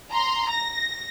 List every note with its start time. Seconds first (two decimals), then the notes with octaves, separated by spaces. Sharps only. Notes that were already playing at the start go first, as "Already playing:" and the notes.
0.12 A#5 C6
0.50 A#6